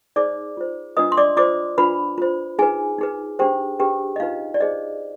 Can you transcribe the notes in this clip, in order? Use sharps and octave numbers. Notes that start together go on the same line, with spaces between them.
D#4 G#4 C5 D5 D6
F4 C5
D4 F4 B4 D#5 D#6
C6
D5 D6
F4 C5 D5 D6
D4 F4 B4 B5
F4 C5
D#4 G#4 B4 G#5
D#4 G#4 B4
D4 G4 G#4 C5 G5
D4 G4 G#4 B4 G5
D#5
D#4 F4 B4 F5
D5
D#4 G#4 C5 D#5